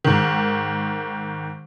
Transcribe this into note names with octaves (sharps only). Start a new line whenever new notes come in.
G#2 D#3